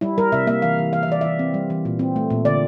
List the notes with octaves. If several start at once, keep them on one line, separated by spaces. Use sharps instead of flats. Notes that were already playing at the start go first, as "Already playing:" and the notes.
G3 E4
G3 A#4
C3 E5
A#3 E5
E3 F5
E3
E3 F5
E5
E3 D5
E3 E5
C4
G3
E3
A#2
C4
A3
A#2
D3 D5